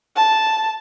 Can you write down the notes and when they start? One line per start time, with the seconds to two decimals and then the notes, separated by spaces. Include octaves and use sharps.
0.16 A5